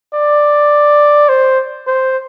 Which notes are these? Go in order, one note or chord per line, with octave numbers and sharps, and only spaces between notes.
D5
C5
C5